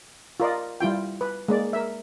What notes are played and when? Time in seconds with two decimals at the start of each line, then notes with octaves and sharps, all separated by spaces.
0.40 F4 A#4 D5 D#5
0.80 G3 E4 F4 G5
1.21 B4
1.48 G#3 A#3 D5
1.73 A#4 E5